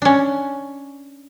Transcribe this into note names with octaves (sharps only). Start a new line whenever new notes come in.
C#4 D4